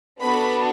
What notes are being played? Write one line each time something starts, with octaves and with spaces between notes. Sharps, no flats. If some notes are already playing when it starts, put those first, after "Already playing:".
B3 D4 F#4 A4 B5